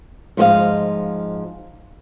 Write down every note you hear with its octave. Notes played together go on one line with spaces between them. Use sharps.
G#2 F3 E4 C5 D#5 F5